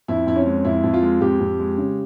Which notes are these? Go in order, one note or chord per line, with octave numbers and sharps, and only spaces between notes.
F2 E4
F2 E4
C#4
G#3
F2 E4
F2
F4
G#3
F2 G4
F2
G#3
C#3